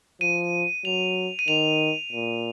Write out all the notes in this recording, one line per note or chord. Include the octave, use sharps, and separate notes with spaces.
F3 D#7
F#3 F7
D#7
D#3 F7
A#2